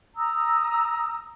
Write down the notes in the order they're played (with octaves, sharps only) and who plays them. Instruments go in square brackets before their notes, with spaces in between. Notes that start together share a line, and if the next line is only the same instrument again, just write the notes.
[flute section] A#5 D#6 E6